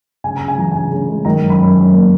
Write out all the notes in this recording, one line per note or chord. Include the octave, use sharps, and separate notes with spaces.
C#3 G#5
C#3 A#5
G#5
E3 A#5
C#3 G#5
C#3
G#3
D#3 A#5
F#2
B5
F#2
F#2
A#3